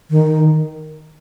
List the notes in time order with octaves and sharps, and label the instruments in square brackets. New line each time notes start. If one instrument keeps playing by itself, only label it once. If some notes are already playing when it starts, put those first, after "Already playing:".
[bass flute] D#3